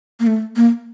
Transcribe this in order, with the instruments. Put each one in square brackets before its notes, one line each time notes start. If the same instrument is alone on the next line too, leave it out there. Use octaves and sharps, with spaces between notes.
[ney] A#3
A3
A#3